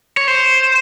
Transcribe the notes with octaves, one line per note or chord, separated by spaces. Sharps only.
C#5
C5